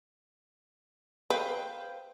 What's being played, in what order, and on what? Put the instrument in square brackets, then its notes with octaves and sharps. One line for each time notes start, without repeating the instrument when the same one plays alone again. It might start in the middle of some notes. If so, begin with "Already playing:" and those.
[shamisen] B4 [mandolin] C5 F5 G5